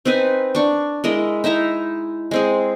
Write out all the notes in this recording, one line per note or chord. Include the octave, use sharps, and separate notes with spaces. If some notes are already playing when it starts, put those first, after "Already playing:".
C4 D#4 B4 G#5
D4 C#6
G#3 E4 A#4 D#5
D#4 E4 E5 A#5
G#3 C4 G#4